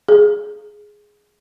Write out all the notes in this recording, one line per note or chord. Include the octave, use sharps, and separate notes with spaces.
G#4